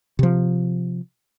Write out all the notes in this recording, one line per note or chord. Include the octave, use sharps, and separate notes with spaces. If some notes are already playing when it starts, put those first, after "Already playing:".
C3 F3